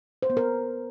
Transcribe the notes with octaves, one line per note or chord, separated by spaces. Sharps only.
C5
B3
A#4